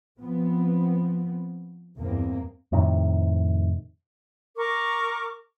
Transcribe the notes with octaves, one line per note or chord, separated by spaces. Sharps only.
F3 B3 C4
E2 G2 A#3 C4
F2 A2 C3 D#3
A#4 C#6 D6